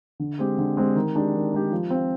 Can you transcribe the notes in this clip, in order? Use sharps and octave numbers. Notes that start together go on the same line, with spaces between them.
D3
G#3 C4 G4
D3
G#3 C4 G4
D#3
G#3 D4 G4
D#3
G#3 D4 G4
F3
C4 F4